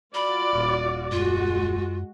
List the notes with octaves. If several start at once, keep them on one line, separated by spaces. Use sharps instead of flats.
F4 F#4 D5 B5
D#1
F#2 G#3 F4 F#4